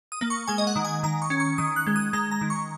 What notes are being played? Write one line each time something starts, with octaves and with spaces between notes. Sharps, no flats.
D#6
A#3
C#6
G#3 G#5
D#5
F#5
D#3
G#5
D#3 A#5
C#6
C#4
C#6
D#3 D#6
F#6
G#3
D#6
G#3 A#5
A#5
D#3
C#6